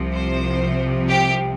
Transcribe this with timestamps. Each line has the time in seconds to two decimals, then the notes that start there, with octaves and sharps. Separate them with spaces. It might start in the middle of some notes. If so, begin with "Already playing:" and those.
Already playing: C2 C3 F3
0.12 C5
1.08 G4